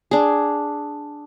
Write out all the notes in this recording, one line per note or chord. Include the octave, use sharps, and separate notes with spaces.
D4 G#4